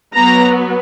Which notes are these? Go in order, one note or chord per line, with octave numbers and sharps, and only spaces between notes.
F#3 B3 A#5